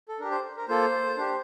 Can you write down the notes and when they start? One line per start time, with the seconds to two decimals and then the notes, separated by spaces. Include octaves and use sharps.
0.08 A4
0.19 D4 A#4
0.24 G4
0.31 C5
0.57 A#4
0.68 A#3 F4 A4 C5
1.17 D4 G4